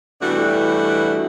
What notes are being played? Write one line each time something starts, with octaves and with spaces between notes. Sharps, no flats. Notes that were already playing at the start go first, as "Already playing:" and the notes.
B2 E3 G3 A3 D4 F#4